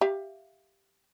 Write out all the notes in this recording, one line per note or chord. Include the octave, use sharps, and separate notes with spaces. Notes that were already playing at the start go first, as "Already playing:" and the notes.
G4 E5 F5